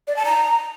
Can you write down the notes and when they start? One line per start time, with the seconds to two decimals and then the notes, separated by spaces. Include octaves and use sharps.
0.08 D5
0.16 A5
0.25 A#5